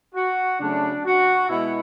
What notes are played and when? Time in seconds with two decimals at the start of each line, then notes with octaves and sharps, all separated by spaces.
0.15 F#4
0.60 C#3 F#3 A3 D4
1.05 F#4
1.49 B2 G#3 B3 E4